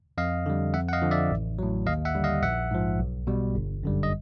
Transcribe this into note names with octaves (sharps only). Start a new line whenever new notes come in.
F2 D#5 F5
D3 G3
F2 E5 F#5
F#5
D#5 F5
D3 F3
D5 E5
A1
A2 F#3
D#2 D#5 F5
E5 F#5
D3 G3
D#5 F5
A#1 E5 F#5
G#2 F3
B1
B2 G3
G1
F#2 D3 G3
D#5